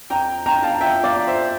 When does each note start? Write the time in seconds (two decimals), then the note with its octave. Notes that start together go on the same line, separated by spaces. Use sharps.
0.10 F2 G5 A#5
0.46 F2 G5 A#5
0.63 F5 A5
0.81 F3 E5 G5
1.04 D5 F5
1.16 F3
1.27 C5 E5